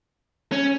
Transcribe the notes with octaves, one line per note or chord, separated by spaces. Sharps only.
C#4